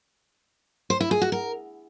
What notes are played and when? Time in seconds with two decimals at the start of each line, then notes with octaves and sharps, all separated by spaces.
0.90 C5
1.00 E4
1.11 G#4
1.22 F#4
1.32 A#4